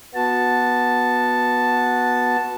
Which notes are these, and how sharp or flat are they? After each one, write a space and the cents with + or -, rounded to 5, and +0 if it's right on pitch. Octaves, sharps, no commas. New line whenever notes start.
B3 -10 F#4 -10 A5 +0